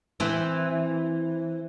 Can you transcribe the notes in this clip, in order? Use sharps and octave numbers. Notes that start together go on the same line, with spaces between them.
E3 C4